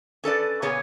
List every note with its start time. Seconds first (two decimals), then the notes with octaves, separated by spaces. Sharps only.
0.24 C#4 A4 B4 D5
0.62 A#2 C#3 B3 G#4 C#5 G#5